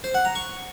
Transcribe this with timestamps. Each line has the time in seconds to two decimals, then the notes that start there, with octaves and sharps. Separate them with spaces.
0.04 C5
0.14 F#5
0.25 A#5
0.35 C#6